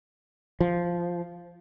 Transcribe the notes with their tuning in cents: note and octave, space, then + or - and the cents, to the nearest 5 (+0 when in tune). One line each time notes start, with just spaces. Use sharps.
F3 -5